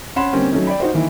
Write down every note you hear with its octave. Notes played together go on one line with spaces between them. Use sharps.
C#4 F#5 B5 C6 E7
D3 G3 A#3 C4 C#4
F#3 A3 C#4 D#4
D5 G5 B5
D#4 F#4 C5
D#3 E3 A#3